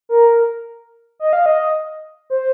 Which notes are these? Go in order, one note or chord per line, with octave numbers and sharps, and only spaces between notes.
A#4
D#5
F5
D#5
C5